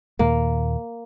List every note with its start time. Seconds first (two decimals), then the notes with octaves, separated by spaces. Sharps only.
0.19 D#2 A#2 A#3